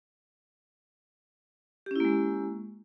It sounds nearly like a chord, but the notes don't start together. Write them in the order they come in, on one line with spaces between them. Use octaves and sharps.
G4 C#4 E4 A#3 G#3